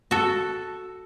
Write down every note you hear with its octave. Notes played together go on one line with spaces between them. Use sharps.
F#4 A4